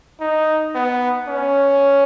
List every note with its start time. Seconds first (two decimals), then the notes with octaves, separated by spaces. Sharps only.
0.20 D#4
0.75 B3
1.27 C#4